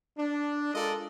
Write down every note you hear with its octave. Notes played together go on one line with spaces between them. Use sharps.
D4
G#3 F4 A4 A#4 D5 D#5